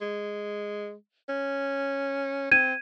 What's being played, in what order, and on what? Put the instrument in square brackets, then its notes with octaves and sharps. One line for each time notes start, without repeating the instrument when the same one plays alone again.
[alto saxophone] G#3
C#4
[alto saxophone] C4 [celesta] G#6 D#7